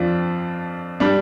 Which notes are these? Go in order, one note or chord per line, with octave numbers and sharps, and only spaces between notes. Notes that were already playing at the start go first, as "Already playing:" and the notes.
Already playing: F2 F3 D4 F4
G3 D4